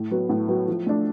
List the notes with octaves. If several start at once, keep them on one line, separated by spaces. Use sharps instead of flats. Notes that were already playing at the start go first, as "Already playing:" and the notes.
Already playing: A2
F#3 B3
A2
F#3 B3
F3
A3 D4